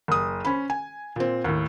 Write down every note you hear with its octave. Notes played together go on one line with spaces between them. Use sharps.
F#1 D#6
C#4 C5 B5
G#5
A#2 C4
D#2 A2